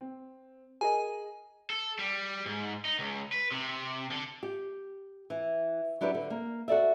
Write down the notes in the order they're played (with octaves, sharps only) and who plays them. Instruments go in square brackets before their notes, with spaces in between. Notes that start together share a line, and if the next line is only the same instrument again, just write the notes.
[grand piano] C4
[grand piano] G#4 A#4 D#5 [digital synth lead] G#5
[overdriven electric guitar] A4
G3
G#2
D#4
C#2
B4
C3
D3
[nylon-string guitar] G4
E3
F#3 D4 E4 G4 B4
D3
A#3
F#4 A4 D5 E5